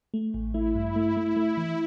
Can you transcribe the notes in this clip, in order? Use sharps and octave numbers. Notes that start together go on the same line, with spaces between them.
A3
A1
A3 E4
G2
A3
A3
A3
E3